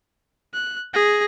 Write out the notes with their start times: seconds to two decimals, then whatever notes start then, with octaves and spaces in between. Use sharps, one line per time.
0.54 F#6
0.94 G#4 A#6